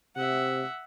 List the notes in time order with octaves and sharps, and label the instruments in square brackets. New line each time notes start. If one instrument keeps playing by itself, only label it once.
[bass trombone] C3 [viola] E5 F#5